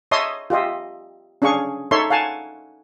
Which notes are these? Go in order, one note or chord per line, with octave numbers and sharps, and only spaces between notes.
C#5 D#5 E5 A5 C6 D#6
F4 G4 D#5 E5
C#4 D4 G#4 F5 C#6
D#4 A4 C#5 E5 C6
F5 F#5 G#5 A5